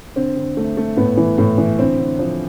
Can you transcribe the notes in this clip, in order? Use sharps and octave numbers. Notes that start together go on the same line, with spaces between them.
D3 C4
D3
A3
A3
A2 B3
E3
A2
E3
D3 C4
D3
F3